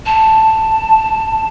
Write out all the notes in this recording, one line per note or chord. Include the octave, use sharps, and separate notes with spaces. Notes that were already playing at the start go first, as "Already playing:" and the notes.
A5